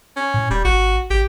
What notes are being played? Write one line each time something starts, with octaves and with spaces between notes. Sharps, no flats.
C#4
A2
D#1 G3
G#1 F#4
G#1 G4